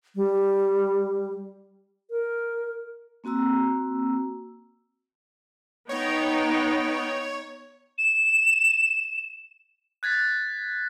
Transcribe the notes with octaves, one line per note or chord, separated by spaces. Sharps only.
G3
A#4
A#3 C4 F#4 A#5 E6
B3 D#4 C#5 G5
E7
F#6 G#6 A6 B6